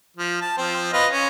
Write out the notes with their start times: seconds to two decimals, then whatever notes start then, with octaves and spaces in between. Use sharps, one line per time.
0.17 F3
0.41 A5
0.57 F3 C4
0.93 F4 B4 D#5
1.11 C#4